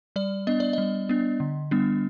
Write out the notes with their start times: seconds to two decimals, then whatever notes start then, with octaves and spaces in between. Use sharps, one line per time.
0.16 G3 D5
0.47 B3 D4 D#5
0.60 D5
0.73 G3 D#5
1.09 B3 D4
1.40 D3
1.71 G3 B3 D4